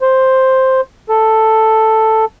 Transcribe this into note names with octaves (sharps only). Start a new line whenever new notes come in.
C5
A4